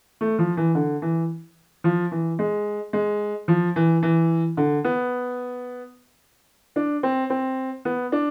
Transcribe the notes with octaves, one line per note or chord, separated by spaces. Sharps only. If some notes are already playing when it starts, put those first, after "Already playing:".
A3
F3
E3
D3
E3
F3
E3
G#3
G#3
F3
E3
E3
D3
B3
D4
C4
C4
B3
D4